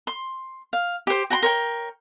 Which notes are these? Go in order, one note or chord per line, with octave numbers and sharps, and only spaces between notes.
C6
F5
G4 C5
F#4 G5 A#5 C6
A#4 C#5 G5